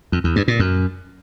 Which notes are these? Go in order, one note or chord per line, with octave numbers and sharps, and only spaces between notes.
F2
E2
G2
A#2
F#2